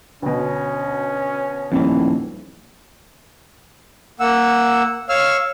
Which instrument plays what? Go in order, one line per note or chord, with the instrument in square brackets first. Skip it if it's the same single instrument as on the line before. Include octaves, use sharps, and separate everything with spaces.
[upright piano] D2 B2 [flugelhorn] C#4
[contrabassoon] D#1 [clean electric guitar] F2 A2 E3
[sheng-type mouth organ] A#3 F#5 E6
C#5 F5 E6 F6